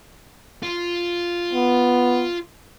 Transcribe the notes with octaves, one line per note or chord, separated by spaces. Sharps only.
F4
B3